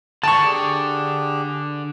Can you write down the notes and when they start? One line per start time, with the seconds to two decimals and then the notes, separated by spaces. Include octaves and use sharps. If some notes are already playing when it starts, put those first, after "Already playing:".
0.23 D3 A5 C#6
0.44 D4 G4 G#4